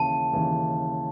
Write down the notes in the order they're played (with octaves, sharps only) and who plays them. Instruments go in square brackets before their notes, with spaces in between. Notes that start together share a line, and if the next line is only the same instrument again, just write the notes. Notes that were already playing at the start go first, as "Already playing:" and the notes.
Already playing: [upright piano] D#2 C#3 E3 [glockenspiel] A5
[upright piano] D#2 C#3 E3